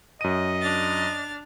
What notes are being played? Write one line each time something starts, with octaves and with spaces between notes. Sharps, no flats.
F#2 D#5 D#7
D4 F6 A6